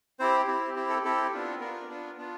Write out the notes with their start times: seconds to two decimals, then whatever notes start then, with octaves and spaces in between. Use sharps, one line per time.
0.19 C4 E4 G4 C5
0.47 C4 E4 G4
0.76 C4 E4 G4
0.90 A4
1.04 C4 E4 G4 A4
1.33 B3 D4 F4
1.60 B3 D4 F4 A#4
1.89 B3 D4 F4
2.18 B3 D4 F4